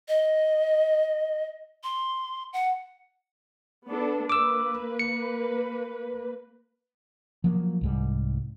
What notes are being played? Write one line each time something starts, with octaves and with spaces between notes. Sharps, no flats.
D#5
C6
F#5
B3 D4 A4
A#3 B4 D6 E6
C#7
F3 F#3 A#3
C2 G#2 G3